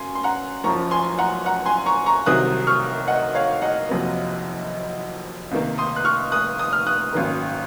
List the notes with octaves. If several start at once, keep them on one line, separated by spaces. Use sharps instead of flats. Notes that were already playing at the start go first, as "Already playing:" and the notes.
Already playing: F#2 G#5 C6
C6
F#5 A#5
F#1 F#2 F3 A#5 C#6
G#5 C6
F#5 A#5
F#5 A#5
G#5 C6
A#5 C#6
A#5 C#6
C2 C3 D#3 F#3 C4 D#6 F#6
C#6 F6
D#5 F#5
C#5 F5
D#5 F#5
F#1 F2 C3 F#3 A#3
C#2 C3 D#3 A#3
C6 D#6
F#6
C#6 F6
D#6 F#6
D#6
F6
D#6 F#6
G#1 F#2 D#3 A#3